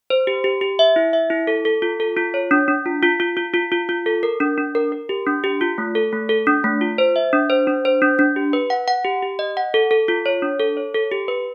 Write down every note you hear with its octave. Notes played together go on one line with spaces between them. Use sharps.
C5
G4
G4
G4
E5
E4
E5
E4
A4
A4
F4
A4
F4
C#5
D4
D4
F4
F4
F4
F4
F4
F4
F4
A4
A#4
D4
D4
A#4
A#4
G4
D4
G4
F4
A3
A4
A3
A4
D4
A3
F4
C5
E5
D4
C5
D4
C5
D4
D4
G4
B4
F#5
F#5
G4
G4
D#5
F#5
A4
A4
F4
C#5
D4
A4
C#5
A4
G4
B4